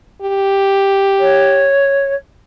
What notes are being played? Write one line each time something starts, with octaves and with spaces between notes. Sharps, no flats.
G4
C#5